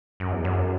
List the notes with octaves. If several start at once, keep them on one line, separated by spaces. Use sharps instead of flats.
F#2
E2
F#2